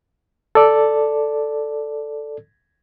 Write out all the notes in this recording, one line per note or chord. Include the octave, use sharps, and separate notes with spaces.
A4 D5